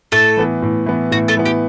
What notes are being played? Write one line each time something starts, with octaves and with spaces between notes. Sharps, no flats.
A2 A3 A4
E3 B3
A2
E3 B3
A2 F#4
A3 A4
E3 B3
G4